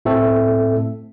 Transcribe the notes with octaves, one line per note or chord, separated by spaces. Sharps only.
A2 A3 C4 A4